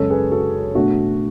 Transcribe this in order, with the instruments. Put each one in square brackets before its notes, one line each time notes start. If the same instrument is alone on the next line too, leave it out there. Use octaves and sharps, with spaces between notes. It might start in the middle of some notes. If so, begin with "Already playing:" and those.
Already playing: [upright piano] F#2 C#3 G#3 A4 C#5
G#4 B4
F#4 A4
B2 A3 D4 F#4